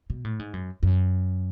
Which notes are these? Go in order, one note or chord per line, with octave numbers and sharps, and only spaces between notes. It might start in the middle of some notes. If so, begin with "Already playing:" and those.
B2
A2
G#2
F#2
F#2